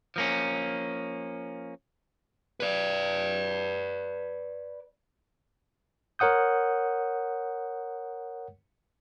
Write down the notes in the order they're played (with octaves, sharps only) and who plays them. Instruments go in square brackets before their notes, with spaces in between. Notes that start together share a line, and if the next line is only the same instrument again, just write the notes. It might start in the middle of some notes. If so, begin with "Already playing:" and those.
[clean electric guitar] F3 A#3 C#4
[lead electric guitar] B4 D5
[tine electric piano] A#4 C#5 F#5 D#6 G6